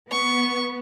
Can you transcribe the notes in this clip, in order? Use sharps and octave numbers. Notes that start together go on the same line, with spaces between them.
B3 C#6